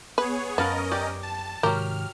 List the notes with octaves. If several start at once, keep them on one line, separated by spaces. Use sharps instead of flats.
B3 G#4 B4 C#5
F#2 B3 C#4 A#4 B4 D#5 F5 A5
G4 D5
A5
G#2 C3 D#3 F#3 G4 A#4 F6